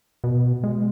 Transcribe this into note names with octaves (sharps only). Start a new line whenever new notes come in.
B2
G#3